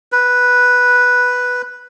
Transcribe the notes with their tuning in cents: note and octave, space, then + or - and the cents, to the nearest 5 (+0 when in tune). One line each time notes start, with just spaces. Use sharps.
B4 -5